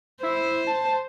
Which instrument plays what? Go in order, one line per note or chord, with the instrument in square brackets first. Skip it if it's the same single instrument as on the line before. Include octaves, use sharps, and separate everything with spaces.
[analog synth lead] E4 [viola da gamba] C5
[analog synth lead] A5